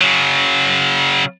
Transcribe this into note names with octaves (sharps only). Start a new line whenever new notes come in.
C#3 F#3